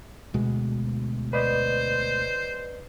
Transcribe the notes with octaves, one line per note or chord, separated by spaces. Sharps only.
D2 B2 G#3
B4 C5 D5 D#5